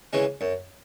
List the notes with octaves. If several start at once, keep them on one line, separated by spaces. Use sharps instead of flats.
C#3 E3 G#3 C#4
F#2